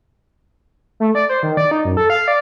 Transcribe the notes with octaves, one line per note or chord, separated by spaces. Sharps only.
A3
D5
C5
D#3
D5
D#4
F#2
A4
F5
D5